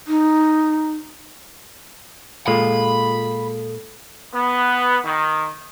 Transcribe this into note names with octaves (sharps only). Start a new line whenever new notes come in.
D#4
A#2 G#3 F4 A4 B5
B3
D#3